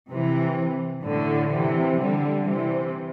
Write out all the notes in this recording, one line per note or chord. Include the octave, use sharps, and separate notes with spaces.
C3 E3
A2 D3
C3 E3
D3 G3
C3 E3